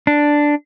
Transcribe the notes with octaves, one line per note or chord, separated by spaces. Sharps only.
D4